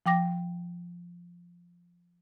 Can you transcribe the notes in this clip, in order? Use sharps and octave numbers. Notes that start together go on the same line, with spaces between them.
F3 G5 D6 A#6